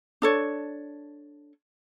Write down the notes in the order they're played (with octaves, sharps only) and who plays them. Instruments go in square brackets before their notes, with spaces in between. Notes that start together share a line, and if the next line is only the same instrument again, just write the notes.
[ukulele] D4 A4 C#5